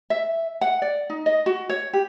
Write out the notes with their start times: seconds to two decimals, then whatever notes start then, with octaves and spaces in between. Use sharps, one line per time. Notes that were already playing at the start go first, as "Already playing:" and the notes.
0.10 E5
0.61 F#5
0.82 D5
1.10 D#4
1.26 D#5
1.46 F#4
1.69 C#5
1.93 G4